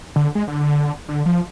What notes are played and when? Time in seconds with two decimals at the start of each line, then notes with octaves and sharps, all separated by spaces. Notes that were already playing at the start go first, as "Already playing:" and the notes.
0.16 D3
0.35 G#3
0.48 D3
1.09 D3
1.26 F3